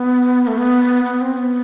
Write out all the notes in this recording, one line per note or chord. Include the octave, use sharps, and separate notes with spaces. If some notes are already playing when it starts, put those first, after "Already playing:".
Already playing: B3
A3
B3
B3
C4
B3